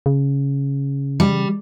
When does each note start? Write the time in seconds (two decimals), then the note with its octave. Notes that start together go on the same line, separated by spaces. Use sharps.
0.06 C#3
1.20 G3